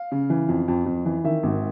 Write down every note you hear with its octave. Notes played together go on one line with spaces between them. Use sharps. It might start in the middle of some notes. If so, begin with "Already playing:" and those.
Already playing: F5
C#3
E3
F2
F2
F2
E3
D#3 E5
G#1